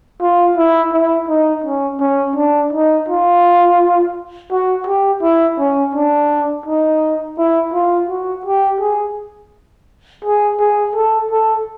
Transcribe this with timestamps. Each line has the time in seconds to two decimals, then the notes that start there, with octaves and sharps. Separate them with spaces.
0.21 F4
0.57 E4
0.93 E4
1.28 D#4
1.64 C#4
2.00 C#4
2.36 D4
2.73 D#4
3.08 F4
4.51 F#4
4.87 G4
5.22 E4
5.58 C#4
5.95 D4
6.66 D#4
7.38 E4
7.74 F4
8.09 F#4
8.46 G4
8.81 G#4
10.25 G#4
10.60 G#4
10.95 A4
11.31 A4